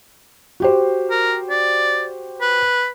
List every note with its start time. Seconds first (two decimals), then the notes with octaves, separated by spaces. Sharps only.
0.60 F#4 G4 C5
1.11 A#4
1.50 D5
2.41 B4